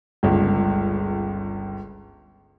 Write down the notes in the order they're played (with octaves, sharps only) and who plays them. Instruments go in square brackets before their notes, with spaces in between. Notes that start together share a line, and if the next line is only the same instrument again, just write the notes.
[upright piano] G1 C#2